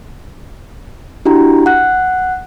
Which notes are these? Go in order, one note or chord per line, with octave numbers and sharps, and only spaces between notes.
D4 E4 F#4 G4 A#5
F#5 F#6